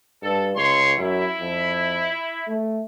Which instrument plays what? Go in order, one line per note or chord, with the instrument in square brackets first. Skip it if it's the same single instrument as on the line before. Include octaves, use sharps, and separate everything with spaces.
[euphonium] G2 [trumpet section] A4
[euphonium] C#2 [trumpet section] C#5 C6
[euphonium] F#2 [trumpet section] E4
[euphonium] F2
A3